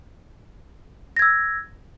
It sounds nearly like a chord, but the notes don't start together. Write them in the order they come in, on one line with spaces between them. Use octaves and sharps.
A#6 G#6 E6